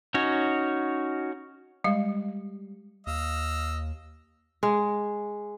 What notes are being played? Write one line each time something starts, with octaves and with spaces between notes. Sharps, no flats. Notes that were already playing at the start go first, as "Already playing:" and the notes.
C#4 D#4 F#4 C#5
G3 G#3 F5
D#2 D#5 F5 E6
G#3